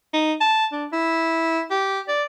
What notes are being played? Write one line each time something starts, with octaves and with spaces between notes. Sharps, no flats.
D#4
A5
D4
E4
G4
D5